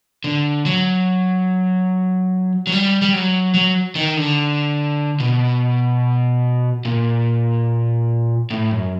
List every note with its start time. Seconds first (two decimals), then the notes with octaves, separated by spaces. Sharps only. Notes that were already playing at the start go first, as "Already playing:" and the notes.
0.24 D3
0.66 F#3
2.67 F#3
2.72 G3
3.02 G3
3.13 F#3
3.54 F#3
3.95 D#3
4.17 D3
5.20 B2
6.85 A#2
8.50 A2
8.71 F#2